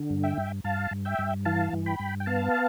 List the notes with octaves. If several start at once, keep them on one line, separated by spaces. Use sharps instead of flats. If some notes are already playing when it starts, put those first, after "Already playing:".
Already playing: D3
G2
E5 G5
G2
G2 F5 A5
G2
E5 G5
G2
E3 F5 A5
G2
G5 B5
G2
G5
B3 F5 A5